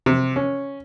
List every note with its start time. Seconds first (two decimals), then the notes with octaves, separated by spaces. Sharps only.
0.06 C3
0.36 C#4